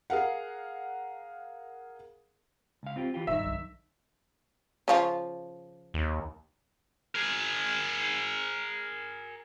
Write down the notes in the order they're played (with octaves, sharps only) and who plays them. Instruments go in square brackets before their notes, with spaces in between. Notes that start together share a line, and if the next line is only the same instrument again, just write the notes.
[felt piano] G#4 A#4 F5 F#5
[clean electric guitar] C#2 F5
C4 F4 G4
E3 F4 G4
[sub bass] D#1 [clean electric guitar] G2 D#3 D#4 [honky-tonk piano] E5
[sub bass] B1
[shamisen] C#3 F3 F4
[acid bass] D#2
[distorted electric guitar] G#4 A#4